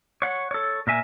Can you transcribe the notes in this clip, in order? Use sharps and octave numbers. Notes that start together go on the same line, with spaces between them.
C#5 F#5
A4 C#5
A#2 A#4 E5 G#5